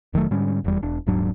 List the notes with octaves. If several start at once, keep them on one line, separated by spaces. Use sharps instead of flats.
F1 D#3 F#3 A3
G#2 D3 G3 C#4
F1 E2 G3
E1 D4
D#1 G#2 F#3 D4